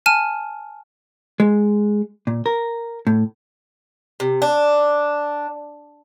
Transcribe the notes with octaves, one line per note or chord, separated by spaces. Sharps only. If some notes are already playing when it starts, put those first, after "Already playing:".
G#5 A5 F6 D#7
G#3
A#2
A#4
A2
C3
D4